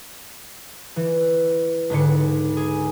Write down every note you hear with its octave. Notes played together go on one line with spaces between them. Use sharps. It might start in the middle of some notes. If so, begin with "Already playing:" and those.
E3
C#2 G#2 D3 C#7
G#4